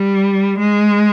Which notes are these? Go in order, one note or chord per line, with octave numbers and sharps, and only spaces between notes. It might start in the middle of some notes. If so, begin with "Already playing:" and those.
Already playing: G3
G#3